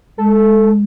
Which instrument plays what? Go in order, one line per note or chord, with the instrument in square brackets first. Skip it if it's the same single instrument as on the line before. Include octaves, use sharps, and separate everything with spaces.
[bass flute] G#3 [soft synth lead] A4